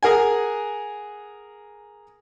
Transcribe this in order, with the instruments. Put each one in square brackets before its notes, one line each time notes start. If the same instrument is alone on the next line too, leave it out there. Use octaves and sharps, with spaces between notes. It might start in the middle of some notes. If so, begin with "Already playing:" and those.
[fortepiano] G#4 A#4 F#5 G#5